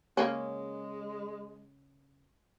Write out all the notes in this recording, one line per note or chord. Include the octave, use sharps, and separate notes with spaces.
C#3 G#3 A#3 C#4